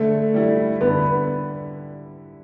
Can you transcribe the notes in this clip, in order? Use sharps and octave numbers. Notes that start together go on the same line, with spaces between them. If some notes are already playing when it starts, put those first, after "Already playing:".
Already playing: D3 A3
G3 E4
D3 B3